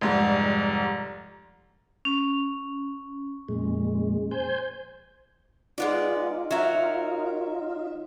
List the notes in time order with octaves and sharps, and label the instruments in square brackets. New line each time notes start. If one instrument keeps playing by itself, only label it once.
[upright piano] F1 G#2 G3
[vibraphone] C#4
[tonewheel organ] F2 A#2 G#3
C5 G#5 G6
[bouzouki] G#3 B3 D5 [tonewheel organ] D#4 F4
[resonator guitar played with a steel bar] F#3 E5 [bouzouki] F#4 A#4